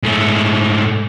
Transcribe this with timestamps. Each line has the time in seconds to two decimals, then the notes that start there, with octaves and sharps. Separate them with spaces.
0.03 G#2 A3